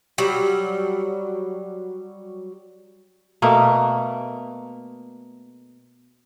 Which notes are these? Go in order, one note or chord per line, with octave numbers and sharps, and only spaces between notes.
F#3 G3
B2 A3 A#3